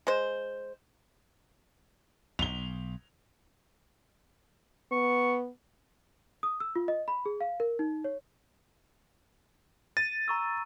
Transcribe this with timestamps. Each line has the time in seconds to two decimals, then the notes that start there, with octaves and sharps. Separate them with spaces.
0.07 G#3 C5
2.39 B1 F7 G7
4.92 B3 C#6
6.43 D#6
6.60 E6
6.76 F4
6.88 D#5
7.08 B5
7.26 G#4
7.41 F5
7.60 A#4
7.79 D#4
8.04 C#5
9.97 A6 D#7
10.28 A#5 C#6 E6